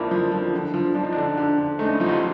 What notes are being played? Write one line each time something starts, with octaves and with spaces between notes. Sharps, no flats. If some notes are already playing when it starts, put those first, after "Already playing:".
Already playing: F2 F3 A#3 D4 E4
F3
F3
D3
F3
F3 D4
D#4
D3 D4
D3
D3
A3 C#4 D#4
E4
F3 D#4 F4
F#4
F4 G4